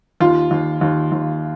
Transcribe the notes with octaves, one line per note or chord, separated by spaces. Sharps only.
D#2 F4
D#2
D#2
D#2